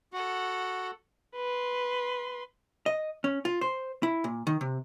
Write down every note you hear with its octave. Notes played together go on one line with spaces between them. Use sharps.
F#4 A4 F#5
B4 C6
D#5
C#4
F4
C5
E4
A#2
D#3
C3